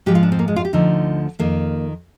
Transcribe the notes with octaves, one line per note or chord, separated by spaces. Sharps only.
G#2 F3 G4
F4
D4
C4
A#3
G#3
F4
G4
D2 D3 F3 D#4
F2 D#3 A#3